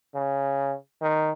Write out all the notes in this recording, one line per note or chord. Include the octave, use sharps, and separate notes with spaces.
C#3
D#3